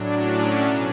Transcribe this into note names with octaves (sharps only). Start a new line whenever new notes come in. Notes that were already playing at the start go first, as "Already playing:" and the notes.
Already playing: A2 F#3 D4
C#4
B2